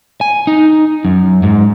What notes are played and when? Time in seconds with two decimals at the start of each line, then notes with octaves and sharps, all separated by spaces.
0.21 G#5
0.47 D#4
1.05 F#2
1.43 G#2